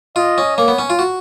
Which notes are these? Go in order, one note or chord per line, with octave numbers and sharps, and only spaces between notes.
F4 D#5
C#4
A#3 C#5
B3
C#4
F4
F#4